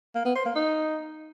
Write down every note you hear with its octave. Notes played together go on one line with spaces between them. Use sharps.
A#3
B3
C5
A#3
D#4